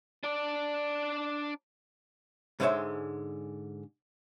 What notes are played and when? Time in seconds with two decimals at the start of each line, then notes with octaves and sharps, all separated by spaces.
0.24 D4 D5
2.60 G#2 D3 G#3 C5 C#5 E5